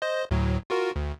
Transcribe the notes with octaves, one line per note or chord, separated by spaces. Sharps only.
C5 D#5
D2 A2 F#3
F4 F#4 A#4
D2